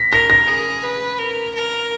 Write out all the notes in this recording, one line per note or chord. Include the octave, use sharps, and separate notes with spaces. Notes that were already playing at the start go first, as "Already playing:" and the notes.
Already playing: A#6 B6
A#4 A#6
A#6
G#4
B4
A#4
A#4